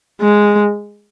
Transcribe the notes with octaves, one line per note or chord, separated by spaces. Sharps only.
G#3